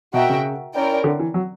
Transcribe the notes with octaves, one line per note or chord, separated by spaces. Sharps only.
B2 F#4 A#4 E5 G5
C#3
C#4 E4 A#4 D5 G5
D3
E3
F#3